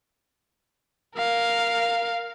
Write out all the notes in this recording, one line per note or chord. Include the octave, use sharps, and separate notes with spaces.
A#4 F5